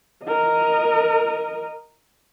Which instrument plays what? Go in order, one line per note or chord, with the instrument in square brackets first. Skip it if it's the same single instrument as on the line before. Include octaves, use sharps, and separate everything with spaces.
[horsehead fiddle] A#4 D#5